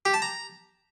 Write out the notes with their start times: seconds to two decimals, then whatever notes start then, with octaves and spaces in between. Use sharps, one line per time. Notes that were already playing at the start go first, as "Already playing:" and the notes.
0.05 G4
0.14 A5
0.22 A#5